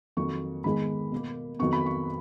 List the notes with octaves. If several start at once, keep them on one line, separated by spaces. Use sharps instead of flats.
F2 D#3 F#3 A#3 C#6
G#2 D#3 G#3 B3 B5
B2 A#3
F2 D#3 F#3 B3 C#6
B5
C#6